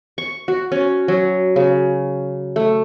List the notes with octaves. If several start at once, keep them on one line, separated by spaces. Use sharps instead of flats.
C#6
F#4
C#4
F#3
C#3
A3